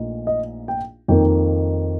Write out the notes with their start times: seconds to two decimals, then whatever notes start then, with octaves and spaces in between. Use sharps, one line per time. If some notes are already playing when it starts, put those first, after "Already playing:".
Already playing: A#1 A#2 A3 D#4
0.27 D#5
0.68 G5
1.08 F2 D#3 A#3 D#4 G5